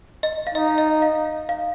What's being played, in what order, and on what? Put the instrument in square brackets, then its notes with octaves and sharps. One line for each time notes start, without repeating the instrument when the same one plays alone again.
[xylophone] D#5
F5
[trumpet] D#4 [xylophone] D#5
[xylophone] D#5
F5
F5